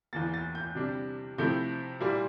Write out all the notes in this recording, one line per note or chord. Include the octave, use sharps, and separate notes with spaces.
E2 E3 A#3 A6
A6
G6
C3 G3 D4
C3 F3 A3 E4 G6
A#2 G3 A#3 E4